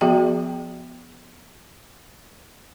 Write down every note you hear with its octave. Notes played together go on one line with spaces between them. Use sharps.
F3 B3 F#4 G#4 E5 G5